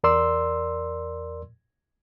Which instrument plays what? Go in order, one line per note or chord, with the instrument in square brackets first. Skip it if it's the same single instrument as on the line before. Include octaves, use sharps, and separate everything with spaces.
[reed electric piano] E2 A#4 D5 C6 E6